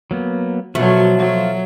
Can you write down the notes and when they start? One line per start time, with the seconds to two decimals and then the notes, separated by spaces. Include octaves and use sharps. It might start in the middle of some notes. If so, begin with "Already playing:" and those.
0.11 F#3 A#3 B3
0.75 B2 F3 F#3 A3 F4 F#4
1.19 F#3